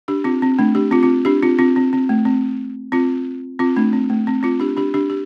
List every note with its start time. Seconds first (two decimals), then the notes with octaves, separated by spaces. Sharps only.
0.08 D4 G4
0.24 C4 F4
0.42 C4
0.59 A3 D4
0.75 D4 G4
0.91 C4 F4
1.03 C4 F4
1.25 D4 G4
1.42 C4 F4
1.59 C4 F4
1.76 C4
1.93 C4
2.09 A3
2.25 C4
2.92 C4 F4
3.59 C4 F4
3.76 A3 D4
3.93 C4
4.10 A3
4.27 C4
4.43 C4 F4
4.60 D4 G4
4.77 D4 G4
4.94 D4 G4
5.10 G4